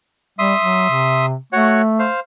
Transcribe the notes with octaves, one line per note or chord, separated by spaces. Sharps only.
G3 E5 C6 D#6
F#3
C3
A3 F#4 C#5 F#5
C5 F5